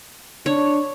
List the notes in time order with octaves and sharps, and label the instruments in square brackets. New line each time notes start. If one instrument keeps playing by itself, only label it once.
[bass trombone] D4 [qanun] C#5